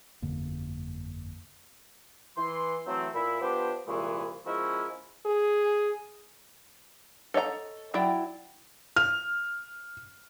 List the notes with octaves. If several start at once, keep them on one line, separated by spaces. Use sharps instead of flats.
G1 F2 D3 A#3
E3 C6
E3 F#3 A3 C4
A#2 E4 B5
F3 B3 D4 G4 C5
C2 A#2 E3 G#3 E4 C#6
F3 G#3 C#4 E4 F#4 A#4
G#4
A4 C#5 D#5 F5 A#5
F#3 E4 D5 G5
F6